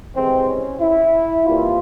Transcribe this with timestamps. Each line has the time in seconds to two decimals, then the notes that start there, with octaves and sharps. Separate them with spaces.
0.15 C3 E3 G#3 C4
0.48 C#4
0.80 E4
1.45 C3 E3 G3 A#3 F4